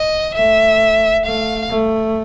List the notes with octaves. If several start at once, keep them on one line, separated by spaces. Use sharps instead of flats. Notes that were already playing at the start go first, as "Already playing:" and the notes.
Already playing: D#5
A3 E5
A3 F5
A3